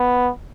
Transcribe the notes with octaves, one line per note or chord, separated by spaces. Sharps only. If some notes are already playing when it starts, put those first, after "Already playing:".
Already playing: B3